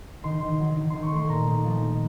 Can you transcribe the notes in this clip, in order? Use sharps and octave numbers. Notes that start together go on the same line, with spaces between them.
D#3 C6
D#3
F#3
D#3
D#3 C6
C#6
A3 C6
A#2 A#5
D#4
F3
D#3